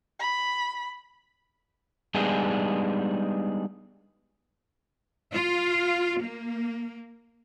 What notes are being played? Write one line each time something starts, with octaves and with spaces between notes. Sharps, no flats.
B5
G3 G#3 B3 D4 D#4 G#4
F4
A#3